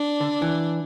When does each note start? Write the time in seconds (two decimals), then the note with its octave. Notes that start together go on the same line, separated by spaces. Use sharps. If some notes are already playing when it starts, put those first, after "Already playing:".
Already playing: D4
0.20 D3
0.42 E3